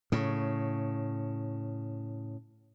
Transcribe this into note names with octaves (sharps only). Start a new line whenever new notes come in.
A2 C#3